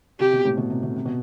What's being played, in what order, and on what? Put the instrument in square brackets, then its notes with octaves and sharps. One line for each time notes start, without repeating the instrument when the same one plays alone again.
[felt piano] C3 [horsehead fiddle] G4
[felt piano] B2
A2
B2
C3
B2
C3
B2